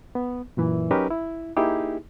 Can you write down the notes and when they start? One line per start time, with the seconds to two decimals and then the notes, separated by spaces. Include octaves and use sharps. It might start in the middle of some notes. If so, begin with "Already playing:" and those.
0.15 B3
0.57 F#2 A#2 E3
0.91 F#3 C#4 D#4 G4 A#4 B4
1.11 E4
1.57 A#3 D#4 E4 G4 G#4